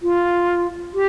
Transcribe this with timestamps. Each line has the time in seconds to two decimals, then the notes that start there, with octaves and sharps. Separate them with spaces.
0.02 F4
0.93 G4